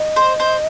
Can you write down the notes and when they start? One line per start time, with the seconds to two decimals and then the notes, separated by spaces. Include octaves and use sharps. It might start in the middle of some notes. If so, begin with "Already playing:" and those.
Already playing: D#5
0.16 C5
0.40 C5